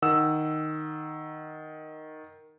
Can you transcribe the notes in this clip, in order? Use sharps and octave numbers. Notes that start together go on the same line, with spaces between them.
D#3 F#5 D#6 E6